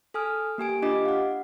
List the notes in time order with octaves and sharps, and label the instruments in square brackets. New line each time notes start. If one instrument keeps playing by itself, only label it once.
[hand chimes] A4 G#5 D#6 F6
A#3 G4 G#5 D7
D4 F4 G4 D#5 D6
F5 F#5